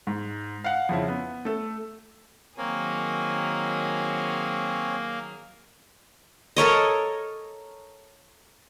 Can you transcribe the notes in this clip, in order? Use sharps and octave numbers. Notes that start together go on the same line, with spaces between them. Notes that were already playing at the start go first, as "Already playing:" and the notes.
G#2
F5 F#5
F2 C#3 E4
B3
A3 A4
D#3 F#3 A#3 C4 G#4 C#5 G#5
A4 A#4 C#5 D#5